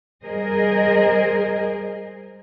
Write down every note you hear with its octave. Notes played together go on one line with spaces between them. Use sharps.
G3 G#4 A#4 C5 D#5